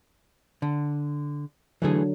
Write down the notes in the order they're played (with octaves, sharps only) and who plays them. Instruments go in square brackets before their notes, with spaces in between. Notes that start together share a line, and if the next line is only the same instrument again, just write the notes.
[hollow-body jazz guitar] D3
[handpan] D3 F#3 [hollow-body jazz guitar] E3 A3 G#4